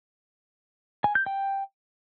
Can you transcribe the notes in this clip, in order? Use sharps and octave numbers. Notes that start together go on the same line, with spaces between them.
G#5
G6
G5